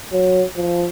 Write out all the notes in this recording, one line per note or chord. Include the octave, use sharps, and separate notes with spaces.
F#3
F3